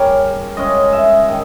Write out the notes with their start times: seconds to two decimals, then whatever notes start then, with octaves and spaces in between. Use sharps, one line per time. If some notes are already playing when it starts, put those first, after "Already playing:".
Already playing: C#3 G3 C#4 A#4
0.57 C#3 G#3 C#4 D#5
0.93 E5
1.28 D#3 D#5